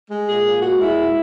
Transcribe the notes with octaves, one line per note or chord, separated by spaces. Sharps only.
G#3
A#2 G#4
A#2
G#3 F#4
G#3 E4
A#2